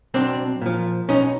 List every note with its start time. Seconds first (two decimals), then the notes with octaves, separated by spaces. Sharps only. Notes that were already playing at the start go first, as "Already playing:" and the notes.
0.14 B1 C4 D4
0.61 A#2 F3
1.09 B1 C#4 D#4